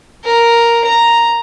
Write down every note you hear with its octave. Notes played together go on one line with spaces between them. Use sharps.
A#4
A#5